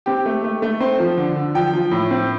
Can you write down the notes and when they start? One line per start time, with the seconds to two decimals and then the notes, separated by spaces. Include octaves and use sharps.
0.06 C4 G4
0.26 A3
0.44 A3
0.62 A3
0.80 C4 C5
1.00 F3
1.17 D3
1.36 D3
1.55 F3 G5
1.73 F3
1.91 A2
2.11 C4